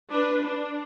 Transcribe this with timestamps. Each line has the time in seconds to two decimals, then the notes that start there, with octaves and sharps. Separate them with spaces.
0.11 D4 B4
0.45 D4